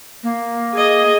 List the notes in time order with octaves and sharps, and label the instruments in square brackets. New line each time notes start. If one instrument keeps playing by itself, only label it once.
[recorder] A#3
[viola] G#4 D#5